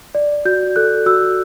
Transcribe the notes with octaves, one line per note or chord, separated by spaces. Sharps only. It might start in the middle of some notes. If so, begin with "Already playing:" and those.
D5
F#4 G6
A4 F#6
F#4 E6